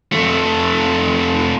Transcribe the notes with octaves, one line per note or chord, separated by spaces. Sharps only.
F2 A3